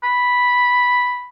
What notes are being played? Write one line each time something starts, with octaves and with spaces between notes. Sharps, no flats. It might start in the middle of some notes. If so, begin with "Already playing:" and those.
B5